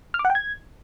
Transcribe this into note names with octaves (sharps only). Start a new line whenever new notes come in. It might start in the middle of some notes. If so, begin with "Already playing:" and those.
F6
D6
F#5
G5
G#6